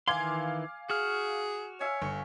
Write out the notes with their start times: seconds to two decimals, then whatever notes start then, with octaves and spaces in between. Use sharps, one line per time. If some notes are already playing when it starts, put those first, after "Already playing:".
0.08 D#3 E3 F5 G#5 C6 D6 G#6
0.90 F#4 G#4 F6
1.81 C#5 E5 F5 G#5
2.02 G1 C#6